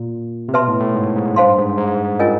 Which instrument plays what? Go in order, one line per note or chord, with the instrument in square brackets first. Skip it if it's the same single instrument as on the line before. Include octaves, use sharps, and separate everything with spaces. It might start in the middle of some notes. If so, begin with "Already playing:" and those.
Already playing: [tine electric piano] A#2
C3
[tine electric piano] B2 [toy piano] B4 E5 A5 C6
[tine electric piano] A2
A2
G#2
G#2
[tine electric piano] G2 [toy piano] C5 F5 A5 C6
[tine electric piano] G#2
G#2
[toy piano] C#4 F4 A#4 D#5 G#5